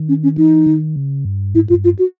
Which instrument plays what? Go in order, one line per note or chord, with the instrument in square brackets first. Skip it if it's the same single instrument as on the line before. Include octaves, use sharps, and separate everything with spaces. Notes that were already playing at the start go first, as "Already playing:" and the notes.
Already playing: [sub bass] D#3
[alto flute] C#4
C#4
[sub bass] E3 [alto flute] D#4
[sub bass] D#3
C#3
G2
[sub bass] G#2 [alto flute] E4
[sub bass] G#2 [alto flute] F4
[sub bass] G2
[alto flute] F4
F#4